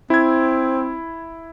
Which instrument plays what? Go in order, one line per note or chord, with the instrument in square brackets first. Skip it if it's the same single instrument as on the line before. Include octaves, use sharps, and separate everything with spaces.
[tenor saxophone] C4 [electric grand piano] E4 G#6